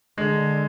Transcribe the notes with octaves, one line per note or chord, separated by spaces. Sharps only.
D3 G#3